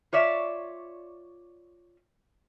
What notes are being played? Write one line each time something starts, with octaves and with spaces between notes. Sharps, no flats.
F4 C#5 D5 E5